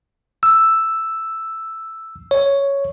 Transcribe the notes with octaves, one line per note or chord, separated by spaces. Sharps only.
E6
C#5